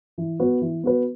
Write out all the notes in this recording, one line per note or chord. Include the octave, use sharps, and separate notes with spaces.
E3
B3 F#4 B4
E3
B3 F#4 B4